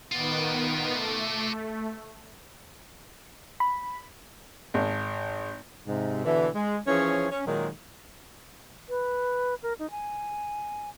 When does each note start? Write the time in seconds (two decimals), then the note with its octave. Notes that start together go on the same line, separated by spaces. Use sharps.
0.12 D#3 B3 F4 D5
0.92 A3
3.60 B5
4.74 G#1
5.86 G#2 C3
6.25 B2 D3 E3
6.55 G#3
6.87 E3 F3 C#4 G#4 C#5
7.31 C#4
7.46 A#2 D#3 F#3 G#3
8.89 B4
9.63 A#4
9.79 D#4
9.91 G#5